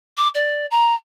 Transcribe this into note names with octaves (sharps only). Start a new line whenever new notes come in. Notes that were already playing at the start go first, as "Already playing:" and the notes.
D6
D5
A#5